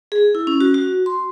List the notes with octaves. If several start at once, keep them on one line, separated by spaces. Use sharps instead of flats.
G#4
E4
C#4
F#4
F#4
C6